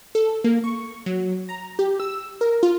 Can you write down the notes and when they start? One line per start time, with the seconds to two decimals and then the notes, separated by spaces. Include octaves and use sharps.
0.15 A4
0.44 A#3
0.64 C#6
1.06 F#3
1.49 A#5
1.79 G4
2.00 E6
2.41 A#4
2.63 F4